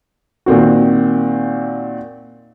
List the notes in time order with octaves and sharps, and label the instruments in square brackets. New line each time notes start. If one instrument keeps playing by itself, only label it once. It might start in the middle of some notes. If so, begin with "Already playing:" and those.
[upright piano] A#2 D#3 C4 F#4